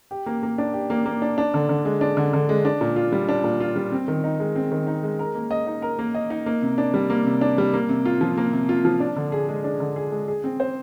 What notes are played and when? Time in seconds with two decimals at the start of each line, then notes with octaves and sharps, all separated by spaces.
0.11 G4
0.26 A#3
0.43 A#3
0.58 D4
0.73 G4
0.90 A#3
1.06 A#3
1.22 D4
1.38 D4
1.54 D3
1.69 D3
1.85 G#3
2.01 D4
2.17 D3
2.33 D3
2.49 G#3
2.65 D4
2.81 A#2
2.96 F4
3.12 G3
3.29 D4
3.44 A#2
3.60 F4
3.76 G3
3.92 C4
4.08 D#3
4.24 D#4
4.40 G#3
4.55 C4
4.72 D#3
4.87 D#4
5.03 G#3
5.19 A#4
5.35 A#3
5.51 D#5
5.67 D#4
5.82 A#4
5.99 A#3
6.14 D#5
6.30 D#4
6.46 A#3
6.62 C3
6.78 D4
6.94 G3
7.10 A#3
7.26 C3
7.41 D4
7.58 G3
7.74 A#3
7.89 C3
8.05 F4
8.21 F3
8.38 A#3
8.53 C3
8.69 F4
8.85 F3
9.00 D4
9.16 D3
9.32 G#4
9.48 G#3
9.64 D4
9.80 D3
9.96 G#4
10.12 G#3
10.28 G#4
10.44 C4
10.60 C5